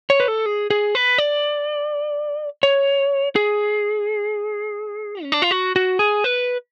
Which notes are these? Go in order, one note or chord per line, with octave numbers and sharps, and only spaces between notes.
C#5
B4
A4
G#4
G#4
B4
D5
C#5
G#4
C#4
D4
F4
F#4
F#4
G#4
B4